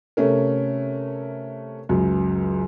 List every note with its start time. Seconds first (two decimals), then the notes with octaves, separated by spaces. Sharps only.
0.17 C3 A3 C#4 A#4
1.89 C#2 F#2